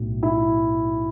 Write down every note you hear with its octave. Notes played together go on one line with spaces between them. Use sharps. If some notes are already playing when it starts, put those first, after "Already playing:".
Already playing: B1 A2 F#3
E4